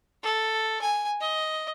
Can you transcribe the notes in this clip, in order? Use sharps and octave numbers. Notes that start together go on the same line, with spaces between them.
A4
G#5
D#5